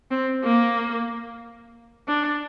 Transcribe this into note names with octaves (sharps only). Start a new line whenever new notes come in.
C4
A#3
D4